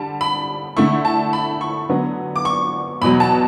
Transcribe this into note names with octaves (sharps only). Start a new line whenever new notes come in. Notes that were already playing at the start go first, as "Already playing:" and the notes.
Already playing: D3 G3 A5
B5
D3 A3 E4 C#6
A5
B5
C#6
D3 F#3 B3
D6
C#6
E2 B2 F#3 B5
A5